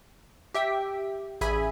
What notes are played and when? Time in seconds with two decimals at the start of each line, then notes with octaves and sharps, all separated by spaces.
0.54 G4 E5 G5
1.41 A1 G#4 E5 G#5 B5